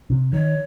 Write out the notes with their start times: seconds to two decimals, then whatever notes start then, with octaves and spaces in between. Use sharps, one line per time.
0.10 C3
0.33 D#3 C#5